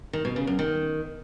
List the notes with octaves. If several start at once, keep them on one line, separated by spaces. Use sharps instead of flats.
D#3
B2
C#3
F#2
D#3